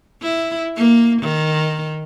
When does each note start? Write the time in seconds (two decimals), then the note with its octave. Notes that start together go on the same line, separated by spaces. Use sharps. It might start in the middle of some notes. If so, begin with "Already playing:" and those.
0.22 E4
0.77 A#3
1.22 D#3